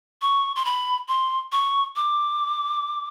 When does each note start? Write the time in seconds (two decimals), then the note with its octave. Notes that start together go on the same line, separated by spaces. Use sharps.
0.22 C#6
0.56 C6
0.65 B5
1.08 C6
1.52 C#6
1.96 D6